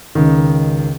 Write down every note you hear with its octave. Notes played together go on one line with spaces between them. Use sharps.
C#2 D#3